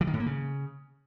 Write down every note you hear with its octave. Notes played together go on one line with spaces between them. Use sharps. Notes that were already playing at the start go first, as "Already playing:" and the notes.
E3
D#3
A2
A#3
C#3